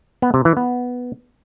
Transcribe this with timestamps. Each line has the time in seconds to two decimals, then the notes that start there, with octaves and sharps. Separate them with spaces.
0.22 B3
0.34 C3
0.45 E3
0.57 B3